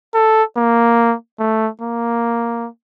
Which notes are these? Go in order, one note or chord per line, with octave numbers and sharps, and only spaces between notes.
A4
A#3
A3
A#3